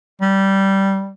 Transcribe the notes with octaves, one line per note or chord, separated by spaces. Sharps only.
G3